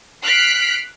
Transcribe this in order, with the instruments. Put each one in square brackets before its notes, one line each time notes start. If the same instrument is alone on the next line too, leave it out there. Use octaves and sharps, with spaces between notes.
[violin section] F6 F#6 B6 C7 D7